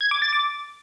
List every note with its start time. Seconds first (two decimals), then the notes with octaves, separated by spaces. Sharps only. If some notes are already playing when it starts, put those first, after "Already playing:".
0.01 G#6
0.11 D6
0.22 A6
0.33 D6